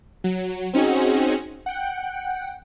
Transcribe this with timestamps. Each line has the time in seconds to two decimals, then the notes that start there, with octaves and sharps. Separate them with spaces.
0.24 F#3
0.73 C4 C#4 D#4 F#4 G#4
1.66 F#5 G5